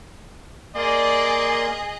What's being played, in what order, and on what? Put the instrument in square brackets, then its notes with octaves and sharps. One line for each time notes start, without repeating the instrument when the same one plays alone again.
[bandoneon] A#3 C6 [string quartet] G#4 D#5 [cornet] D5